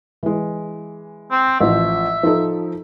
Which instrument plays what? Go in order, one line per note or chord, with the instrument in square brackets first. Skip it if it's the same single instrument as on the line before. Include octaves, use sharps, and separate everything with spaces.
[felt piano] E3 G#3
[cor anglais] C4
[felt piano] A1 F3 [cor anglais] E5
[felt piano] F3 D#4 A4